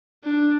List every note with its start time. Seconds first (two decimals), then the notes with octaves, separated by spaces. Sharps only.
0.24 D4